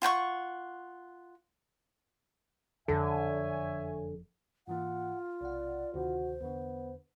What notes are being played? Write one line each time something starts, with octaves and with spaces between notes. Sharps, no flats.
F4 F#5 G5 C#6
F#1 F2 D3 A4 C#5 E5 G#5
G#2 E3 A#3 F4 F#5
B1 C3 D5 F#5
D2 C3 D#3 F#4 C5
E2 D3 B3